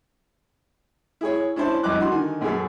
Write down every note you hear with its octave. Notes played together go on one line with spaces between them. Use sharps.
E4 G#4 C#5
C#4 D4 E4 C5 A5
C2 F2 E4 D#5 D6 F#6
D4 F#4 C6
D3 D#3 G#5
B1 F#2 A#2 G#4 A4